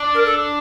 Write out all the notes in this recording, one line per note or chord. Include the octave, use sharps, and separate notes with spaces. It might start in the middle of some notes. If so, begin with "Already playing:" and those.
Already playing: D4
A#4
A4